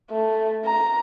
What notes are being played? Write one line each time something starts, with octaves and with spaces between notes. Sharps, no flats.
A3
A#5